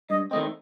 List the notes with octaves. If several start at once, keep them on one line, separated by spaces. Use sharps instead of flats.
G2 D#5
D#3 A3 C4 D#5